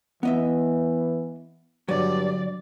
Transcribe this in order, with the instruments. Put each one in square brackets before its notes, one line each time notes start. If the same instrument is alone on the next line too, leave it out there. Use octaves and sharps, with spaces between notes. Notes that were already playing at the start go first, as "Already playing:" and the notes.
[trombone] E3 [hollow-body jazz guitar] B3 D#5 E5
[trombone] G2 [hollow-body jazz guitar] D3 F#3 [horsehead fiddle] D5